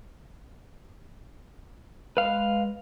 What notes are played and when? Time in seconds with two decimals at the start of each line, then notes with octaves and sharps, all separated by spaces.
2.17 G#3 B4 F5